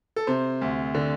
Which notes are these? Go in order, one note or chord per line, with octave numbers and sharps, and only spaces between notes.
A4
C3 C5
D2
D3